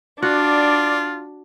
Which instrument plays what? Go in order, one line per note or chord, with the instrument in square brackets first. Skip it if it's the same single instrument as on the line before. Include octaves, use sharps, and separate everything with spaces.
[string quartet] D4 [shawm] F4 [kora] F#4 [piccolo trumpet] D5